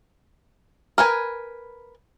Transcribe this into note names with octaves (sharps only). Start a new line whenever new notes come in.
A#4 B4 G#5